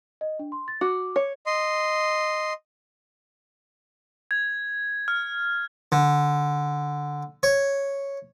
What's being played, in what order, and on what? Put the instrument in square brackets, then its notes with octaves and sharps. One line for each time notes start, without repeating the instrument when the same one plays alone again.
[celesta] D#5
D4
C6
A6
[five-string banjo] F#4 [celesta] D6
[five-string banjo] C#5
[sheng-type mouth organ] D#5 C6
[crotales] G#6
F6
[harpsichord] D3
C#5